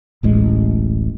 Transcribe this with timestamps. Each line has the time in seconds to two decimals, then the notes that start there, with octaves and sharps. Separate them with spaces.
0.23 D1 A1 G#3